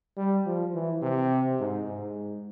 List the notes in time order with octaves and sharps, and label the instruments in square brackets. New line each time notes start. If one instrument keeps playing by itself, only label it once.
[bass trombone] G3
F3
E3
C3
G#2
G#2